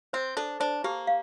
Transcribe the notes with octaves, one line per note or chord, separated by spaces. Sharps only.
C4 C5
D4 A4
D4 C5
A#3 G4
F5